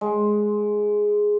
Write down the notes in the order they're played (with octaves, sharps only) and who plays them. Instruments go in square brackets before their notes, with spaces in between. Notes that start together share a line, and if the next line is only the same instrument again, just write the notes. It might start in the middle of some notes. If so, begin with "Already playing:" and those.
[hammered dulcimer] G#3